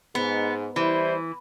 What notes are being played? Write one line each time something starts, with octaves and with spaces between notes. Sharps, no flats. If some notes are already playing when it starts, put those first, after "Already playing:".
G#2 B3
E3 G3 E4 C5